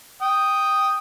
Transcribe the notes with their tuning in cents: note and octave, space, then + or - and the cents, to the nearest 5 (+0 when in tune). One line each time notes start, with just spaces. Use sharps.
G5 +0 D#6 +0